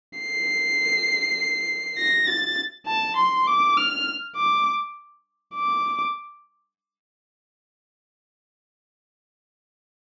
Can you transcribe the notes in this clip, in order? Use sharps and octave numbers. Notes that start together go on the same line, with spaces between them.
C7
A#6
A6
A5
C6
D6
F6
D6
D6